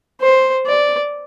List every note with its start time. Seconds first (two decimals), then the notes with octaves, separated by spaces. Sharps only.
0.21 C5
0.67 D5